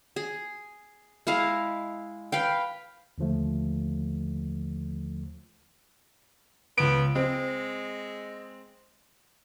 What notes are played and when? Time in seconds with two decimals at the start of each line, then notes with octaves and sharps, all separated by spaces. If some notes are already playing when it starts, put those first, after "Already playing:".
0.16 G#4
1.27 G#3 E4 D#5 F5
2.32 B4 F5 G5
3.18 D#2 D3 F3 A3
6.78 C#2 B3 D7
7.15 G#3 C4